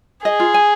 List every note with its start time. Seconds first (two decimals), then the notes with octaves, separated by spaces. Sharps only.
0.25 G#4 D#5
0.40 F4
0.54 G#5